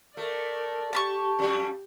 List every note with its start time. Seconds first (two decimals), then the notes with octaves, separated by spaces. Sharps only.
0.17 A3 A#4 D5
0.93 G4 A5 B5 C#6
1.39 F2 G3